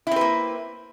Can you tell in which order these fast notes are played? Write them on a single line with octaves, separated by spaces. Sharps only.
E4 C4 B4 A#3